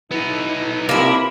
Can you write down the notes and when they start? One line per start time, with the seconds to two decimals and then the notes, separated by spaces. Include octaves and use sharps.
0.11 B3 D#4 E4
0.89 C2 F3 A#3 E4 B5